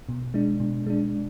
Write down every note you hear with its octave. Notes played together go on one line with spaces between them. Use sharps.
B2
G#3 D4
B2
G#3 D4